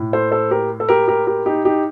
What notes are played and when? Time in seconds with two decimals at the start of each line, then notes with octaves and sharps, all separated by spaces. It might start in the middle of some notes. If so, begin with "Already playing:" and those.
Already playing: A2
0.13 A4 C5
0.32 A4 C5
0.51 G4 A#4
0.80 A4
0.89 G4 A#4
1.08 G4 A#4
1.27 G4 A#4
1.46 D#4 G4
1.65 D#4 G4